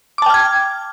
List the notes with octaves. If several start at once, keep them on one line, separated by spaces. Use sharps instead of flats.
G5 A5 D6 F6 G#6